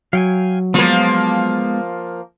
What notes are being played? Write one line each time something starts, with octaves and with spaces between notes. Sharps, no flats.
F#3 F5 G5 G#5
F3 G#3 A#3 B3